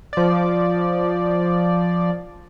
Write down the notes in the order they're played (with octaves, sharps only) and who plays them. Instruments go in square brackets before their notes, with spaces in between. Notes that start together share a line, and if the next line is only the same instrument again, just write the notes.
[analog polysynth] F3 D5